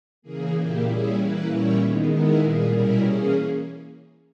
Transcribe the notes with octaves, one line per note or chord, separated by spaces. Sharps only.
C#3 E3 A#3 G#4
A#2 A#3 E4 G4
G3 C#4 E4 G#4
E3 A#3 E4 B4
A#2 G3 C#4 E4 C#5
D#3 G#3 B3
D#3 G#3 B3 E4 A#4
A#2 G3 A#3 G#4
B2 G3 C#4 E4 A#4
E3 A#3 C#4 G#4